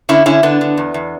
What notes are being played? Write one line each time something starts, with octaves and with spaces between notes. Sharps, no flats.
D3 C#4 E4
D3 C#4 E4
D3 B3 D4
D3
E2
E2